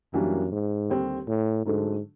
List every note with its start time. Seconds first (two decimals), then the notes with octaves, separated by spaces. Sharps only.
0.13 F#2 E3 G3 A#3 D4 F#4
0.52 G#2
0.90 D#2 D3 G3 C4
1.28 A2
1.65 G#2 D3 F#3 A3 D4